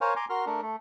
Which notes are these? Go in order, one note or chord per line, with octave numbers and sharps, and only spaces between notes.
A#4 C5 C#5 F5 G#5
G#5 A#5 C6 D6
F#4 A#4 C6 F6
A3 D4 A#4
A3